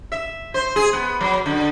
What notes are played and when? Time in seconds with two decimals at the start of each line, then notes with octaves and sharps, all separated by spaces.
0.12 E5
0.54 C5
0.76 G#4
0.93 B3
1.21 F#3
1.46 D3